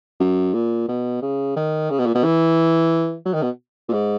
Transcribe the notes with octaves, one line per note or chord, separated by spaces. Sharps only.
F#2
A#2
B2
C#3
D#3
C#3
B2
A#2
B2
E3
F#3
D#3
B2
A#2
G#2